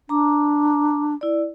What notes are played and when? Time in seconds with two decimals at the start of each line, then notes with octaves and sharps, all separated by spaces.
0.09 D4 A#5 D6
1.21 E4 D5